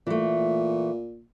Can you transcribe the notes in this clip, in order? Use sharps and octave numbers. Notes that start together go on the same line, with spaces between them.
A#2 E3 A3